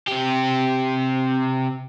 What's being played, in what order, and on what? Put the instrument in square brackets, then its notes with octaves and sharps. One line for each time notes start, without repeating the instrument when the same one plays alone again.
[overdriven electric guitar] C3 G4